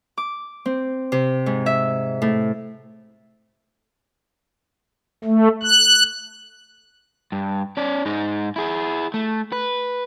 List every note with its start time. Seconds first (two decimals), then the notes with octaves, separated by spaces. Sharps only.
0.17 D6
0.65 C4
1.12 C3
1.46 G#2
1.66 E5
2.22 A2
5.24 A3
5.63 F#6
7.32 G2
7.77 C#4 D5
8.06 G#2 D#4
8.56 E4 G#4
9.14 A3
9.52 B4